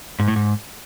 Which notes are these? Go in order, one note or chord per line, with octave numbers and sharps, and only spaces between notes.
G#2
A2
G#2